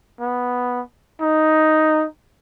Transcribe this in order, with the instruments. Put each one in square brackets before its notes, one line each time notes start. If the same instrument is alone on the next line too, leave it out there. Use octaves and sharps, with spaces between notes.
[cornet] B3
D#4